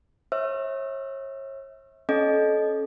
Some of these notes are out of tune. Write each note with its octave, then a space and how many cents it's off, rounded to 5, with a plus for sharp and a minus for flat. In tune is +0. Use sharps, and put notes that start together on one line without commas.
C#5 -35 E5 -25 E6 +40
C#4 -5 A4 -30 D#5 -15